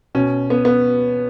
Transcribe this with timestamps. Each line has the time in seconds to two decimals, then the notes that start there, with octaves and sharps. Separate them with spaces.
0.15 B2 C#4
0.50 B3
0.65 B3